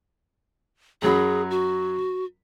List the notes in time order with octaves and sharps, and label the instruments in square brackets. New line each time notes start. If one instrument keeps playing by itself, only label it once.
[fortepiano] F#2 F#3 B5 [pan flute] G#4
[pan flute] F#4